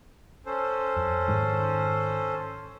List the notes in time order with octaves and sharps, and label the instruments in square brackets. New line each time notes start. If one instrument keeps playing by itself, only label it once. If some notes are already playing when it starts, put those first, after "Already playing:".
[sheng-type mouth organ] C#4 A4 C5
[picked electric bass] F2
G#2 D#3 G#3